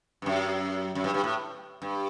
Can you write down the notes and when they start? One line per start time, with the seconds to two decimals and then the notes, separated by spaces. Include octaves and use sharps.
0.22 G2
0.26 F#2
0.95 F#2
1.04 G2
1.14 G2
1.24 A2
1.82 G2